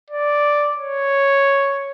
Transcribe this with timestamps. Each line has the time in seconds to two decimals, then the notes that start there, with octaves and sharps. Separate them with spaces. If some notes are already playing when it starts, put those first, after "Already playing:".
0.10 D5
0.76 C#5